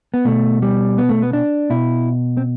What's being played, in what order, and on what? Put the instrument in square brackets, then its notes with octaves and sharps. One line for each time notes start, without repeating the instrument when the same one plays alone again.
[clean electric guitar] B3
B2 A3
G3
B3
A3
B3
D4
B2 E4
C4